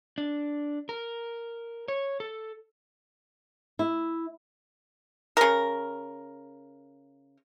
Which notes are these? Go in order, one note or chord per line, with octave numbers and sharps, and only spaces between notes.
D4
A#4
C#5
A4
E4
C#3 A#4